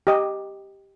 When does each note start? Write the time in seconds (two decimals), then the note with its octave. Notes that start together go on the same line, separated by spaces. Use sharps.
0.07 G4 D#5